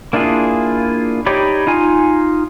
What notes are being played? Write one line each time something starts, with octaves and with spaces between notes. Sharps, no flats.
A#3 D4 E4 F4 G#4
D#4 G4 C#5 D5 B5
D#4 F4 G#5